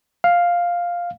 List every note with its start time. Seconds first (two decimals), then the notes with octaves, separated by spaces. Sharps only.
0.24 F5